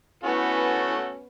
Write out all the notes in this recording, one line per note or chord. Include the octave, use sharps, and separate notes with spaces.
A3 B3 C#4 E4 F#4 A4 B4 G#5